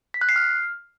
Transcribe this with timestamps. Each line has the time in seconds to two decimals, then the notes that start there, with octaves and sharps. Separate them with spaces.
0.14 B6
0.21 F#6
0.29 C7
0.36 F6